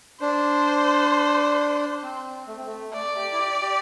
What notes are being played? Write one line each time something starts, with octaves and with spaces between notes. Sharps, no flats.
D4 C5
C4
A3
C4
A3
A3 D5
G4
E4
G4
G4